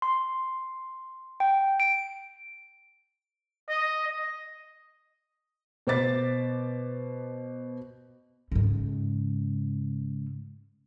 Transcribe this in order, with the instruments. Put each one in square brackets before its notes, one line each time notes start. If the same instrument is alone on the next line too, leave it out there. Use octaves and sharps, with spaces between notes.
[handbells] C6
G5
D7
[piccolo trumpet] D#5
D#5
[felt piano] B2 C5 D6 A6 B6
[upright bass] G#2 C#3